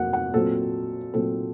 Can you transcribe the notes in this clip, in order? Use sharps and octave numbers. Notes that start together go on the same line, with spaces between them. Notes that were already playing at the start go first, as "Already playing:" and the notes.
Already playing: F2 C3 F#3 A#3 F#5
F#5
A#2 F#3 C4 A4
A#2 F#3 C4 A4